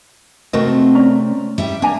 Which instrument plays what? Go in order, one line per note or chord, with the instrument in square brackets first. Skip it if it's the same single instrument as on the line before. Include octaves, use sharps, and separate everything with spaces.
[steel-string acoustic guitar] C3 A3 C4 [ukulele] F#4 A#4 D#5
[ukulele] C#4 D5 A#5
[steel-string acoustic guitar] G3 E5 G5
[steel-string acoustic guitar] A#3 [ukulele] D4 G#5 A#5